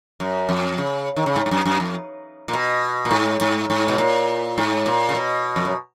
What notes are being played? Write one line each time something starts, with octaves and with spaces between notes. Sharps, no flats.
F#2
F2
C#3
D#3
C#3
G#2
G#2
F#2
F#2
F2
A#2
B2
A#2
G#2
G#2
G#2
B2
A#2
G#2
A#2
C#3
B2
F2
F#2